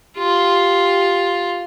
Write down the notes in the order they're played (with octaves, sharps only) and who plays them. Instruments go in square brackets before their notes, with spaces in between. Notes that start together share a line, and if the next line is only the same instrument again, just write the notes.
[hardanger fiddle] F4 [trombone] G4